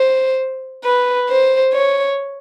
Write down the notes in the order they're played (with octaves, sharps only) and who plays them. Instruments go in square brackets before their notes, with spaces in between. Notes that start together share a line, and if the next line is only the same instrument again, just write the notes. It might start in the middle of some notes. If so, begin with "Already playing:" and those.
Already playing: [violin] C5
B4
C5
C#5